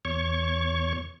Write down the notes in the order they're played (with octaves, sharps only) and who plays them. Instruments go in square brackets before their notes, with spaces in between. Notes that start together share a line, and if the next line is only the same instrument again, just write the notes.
[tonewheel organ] E2 C#5 C#6